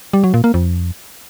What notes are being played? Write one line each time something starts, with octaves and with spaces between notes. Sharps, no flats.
G3
F#3
A#2
A#3
F2